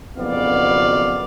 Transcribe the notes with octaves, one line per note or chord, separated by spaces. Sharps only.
F#1 F2 B2 B3 D5 F5